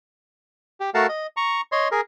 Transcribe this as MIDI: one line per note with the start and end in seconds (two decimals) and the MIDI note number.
0.80 0.90 67
0.94 1.07 57
0.94 1.07 66
0.94 1.07 70
0.94 1.07 77
0.94 1.07 78
0.94 1.07 81
1.09 1.27 75
1.37 1.61 82
1.37 1.61 85
1.72 1.88 73
1.72 1.88 75
1.72 1.88 84
1.92 2.01 68
1.92 2.01 70